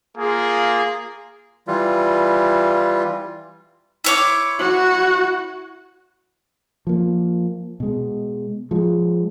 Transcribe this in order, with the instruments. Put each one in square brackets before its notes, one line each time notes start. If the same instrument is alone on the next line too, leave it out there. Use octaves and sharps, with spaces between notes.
[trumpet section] A#3 F4 G#4
[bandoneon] E3 G3 F4
[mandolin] E4 C#5 D6
[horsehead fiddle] F#4
[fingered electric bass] F3 A#3
B2 G#3
F3 G#3